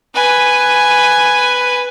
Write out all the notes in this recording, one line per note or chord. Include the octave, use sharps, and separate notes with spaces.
B4 G#5